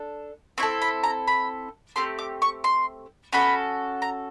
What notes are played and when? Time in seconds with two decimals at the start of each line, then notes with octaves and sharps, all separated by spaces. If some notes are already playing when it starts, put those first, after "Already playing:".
Already playing: D4 A4
0.58 C4 E4 A4 C#6
0.82 B5
1.04 A#5
1.28 B5
1.96 A3 C4 G4 C6
2.19 D6
2.42 C#6
2.64 C6
3.33 C#4 F#4 A4 B5
4.02 A#5